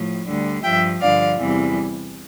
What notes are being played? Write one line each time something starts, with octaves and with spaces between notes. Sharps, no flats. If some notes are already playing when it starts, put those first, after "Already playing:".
Already playing: A2 F3
D2 D3 G3
G2 F3 E5 G5
G2 D3 F3 D5 F5
E2 C3 E3 G3